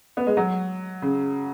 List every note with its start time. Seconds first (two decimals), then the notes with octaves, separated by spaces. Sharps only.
0.17 B3
0.27 G#3
0.37 F#3
1.02 C#3